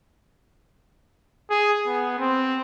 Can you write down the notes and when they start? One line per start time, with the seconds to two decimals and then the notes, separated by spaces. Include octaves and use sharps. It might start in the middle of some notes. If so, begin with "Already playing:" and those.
1.50 G#4
1.87 B3
2.19 C4